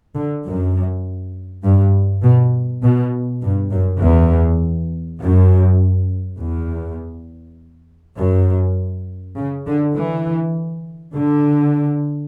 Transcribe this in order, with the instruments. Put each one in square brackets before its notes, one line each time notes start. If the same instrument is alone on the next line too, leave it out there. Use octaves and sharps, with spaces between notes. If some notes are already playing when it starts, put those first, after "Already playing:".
[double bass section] D3
F#2
G2
B2
B2
G2
F#2
E2
F#2
E2
F#2
C#3
D3
E3
D3